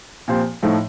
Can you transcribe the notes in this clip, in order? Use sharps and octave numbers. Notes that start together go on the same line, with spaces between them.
A#2 F3 C4 G4 C5
A2 F3 A3 D#4